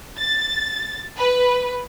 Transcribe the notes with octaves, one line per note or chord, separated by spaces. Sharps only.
A6
B4